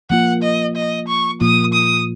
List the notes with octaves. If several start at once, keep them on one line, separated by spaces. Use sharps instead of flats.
F3 A#3 F4 F#5
D#5
D#5
C#6
A#2 F3 A#3 F4 D#6
D#6